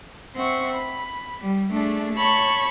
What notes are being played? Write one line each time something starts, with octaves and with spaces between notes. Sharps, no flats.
C4 C5 E5 F#5 C#6
B5
G3
A3 D4 G#4
C#5 A5 B5 C#6